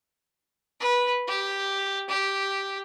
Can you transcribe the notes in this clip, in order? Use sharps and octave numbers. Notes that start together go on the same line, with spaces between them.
B4
G4
G4